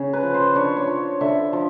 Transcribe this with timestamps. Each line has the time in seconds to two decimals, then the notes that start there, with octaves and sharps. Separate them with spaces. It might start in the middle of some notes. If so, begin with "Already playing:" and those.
Already playing: C#3 C#5
0.13 B4
0.23 F3
0.34 C5
0.55 D4 C#5
0.77 C#5
0.87 F3
1.21 D3 E5
1.53 F3